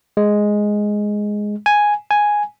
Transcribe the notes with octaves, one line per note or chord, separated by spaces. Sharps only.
G#3
G#5
G#5